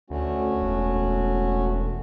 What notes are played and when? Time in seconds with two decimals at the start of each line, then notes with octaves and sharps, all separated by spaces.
0.10 D2 A3 C#4 F#4
0.61 E1